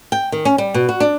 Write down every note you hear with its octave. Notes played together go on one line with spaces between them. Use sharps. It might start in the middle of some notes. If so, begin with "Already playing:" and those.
G5
D#3
C#4
G3
B2
F#4
D4